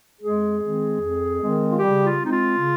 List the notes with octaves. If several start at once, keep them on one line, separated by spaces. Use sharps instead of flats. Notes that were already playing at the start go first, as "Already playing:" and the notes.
F2 G#3 G#4
D#3 G#3 C4
F2
D#3 G#3 C4
F4
C#3 G3 G4
F4
G#3 C4
D#4
F4
C#3